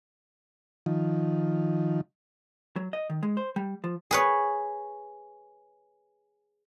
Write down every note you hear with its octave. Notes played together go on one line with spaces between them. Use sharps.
D#3 F3
F#3
D#5
D#3
G#3
C5
G3
F3
G#4 B4 C#5